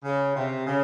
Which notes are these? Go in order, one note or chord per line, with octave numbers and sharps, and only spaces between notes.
C#3
C3
C#3